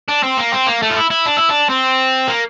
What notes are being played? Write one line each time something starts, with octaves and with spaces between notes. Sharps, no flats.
D4
C4
A#3
C4
A#3
A3
F4
E4
E4
D4
E4
D4
C4
A#3